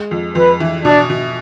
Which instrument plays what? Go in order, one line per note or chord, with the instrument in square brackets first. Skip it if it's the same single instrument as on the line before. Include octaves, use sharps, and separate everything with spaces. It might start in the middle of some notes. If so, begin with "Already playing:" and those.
Already playing: [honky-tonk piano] G#3
F2
[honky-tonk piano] F2 [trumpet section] B4
[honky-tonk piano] E3
[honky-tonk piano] B2 [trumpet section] D4
[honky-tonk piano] B2